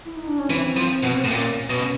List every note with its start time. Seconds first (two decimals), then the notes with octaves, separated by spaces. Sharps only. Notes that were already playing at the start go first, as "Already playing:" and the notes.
0.05 E4
0.17 D#4
0.27 D4
0.39 C#4
0.49 E3 C4
0.77 F3
1.03 B2
1.24 A2
1.29 A#2 C#4
1.70 B2